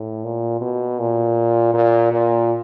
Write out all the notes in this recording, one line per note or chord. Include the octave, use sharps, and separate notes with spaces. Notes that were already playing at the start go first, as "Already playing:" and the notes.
Already playing: A2
A#2
B2
A#2
A#2
A#2